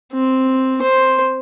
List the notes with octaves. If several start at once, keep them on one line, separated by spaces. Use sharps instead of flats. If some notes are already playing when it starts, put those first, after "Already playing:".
C4
C5